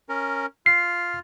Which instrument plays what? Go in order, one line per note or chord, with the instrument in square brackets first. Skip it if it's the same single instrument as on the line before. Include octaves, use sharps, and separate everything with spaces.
[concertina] C#4 A#4
[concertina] F4 F6 [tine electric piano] C7